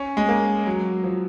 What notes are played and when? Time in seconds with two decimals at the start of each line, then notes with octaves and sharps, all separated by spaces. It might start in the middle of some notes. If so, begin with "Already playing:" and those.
Already playing: C#4
0.17 G#3
0.29 A#3
0.67 F#3
1.04 F3